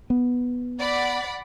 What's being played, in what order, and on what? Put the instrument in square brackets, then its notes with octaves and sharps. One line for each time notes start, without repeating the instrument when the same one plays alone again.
[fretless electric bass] B3
[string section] D5 F#5 B5